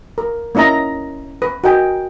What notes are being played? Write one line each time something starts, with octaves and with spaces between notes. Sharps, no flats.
A#4
A#3 C#4 E4 D#5 A#5
B4
F#4 A#4 D#5 G5 G#5